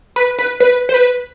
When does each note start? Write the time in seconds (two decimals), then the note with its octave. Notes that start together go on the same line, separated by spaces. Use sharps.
0.16 B4
0.39 B4
0.60 B4
0.89 C5
0.94 B4